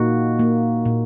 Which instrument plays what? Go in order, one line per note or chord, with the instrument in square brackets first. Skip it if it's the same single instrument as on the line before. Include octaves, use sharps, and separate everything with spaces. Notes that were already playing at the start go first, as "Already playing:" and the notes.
Already playing: [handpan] A#2 A#3 D#4 F#4
A#3
A#2